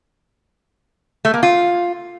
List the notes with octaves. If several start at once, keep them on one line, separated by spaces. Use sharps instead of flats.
A3
A#3
F4